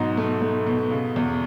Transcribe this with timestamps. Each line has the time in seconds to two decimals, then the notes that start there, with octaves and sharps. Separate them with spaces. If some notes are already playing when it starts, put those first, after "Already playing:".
Already playing: G#2 B2 F#3 D#4
0.17 A3
0.42 A3
0.66 B2
0.91 C#3
1.16 E2